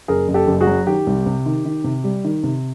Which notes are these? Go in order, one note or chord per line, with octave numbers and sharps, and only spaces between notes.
F#1 G#4 A#4
F#1
G4 A4
F#1
F#4 G#4
F#3
D#3 G4
C2
C3
D#3
D#3
C3
G3
D#3
C3